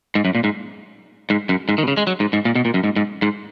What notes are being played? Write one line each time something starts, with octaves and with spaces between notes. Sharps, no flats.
G#2
F#2
A#2
G#2
G#2
F#2
G#2
D#3
B2
C#3
G#3
F#3
G#2
G#2
A#2
B2
A#2
F#2
G#2
G#2
G#2